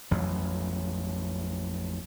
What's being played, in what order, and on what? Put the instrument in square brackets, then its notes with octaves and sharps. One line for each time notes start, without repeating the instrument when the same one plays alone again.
[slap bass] A1 F2 F#3